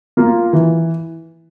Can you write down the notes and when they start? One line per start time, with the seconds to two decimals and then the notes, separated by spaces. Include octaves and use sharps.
0.17 A#3 F4
0.53 E3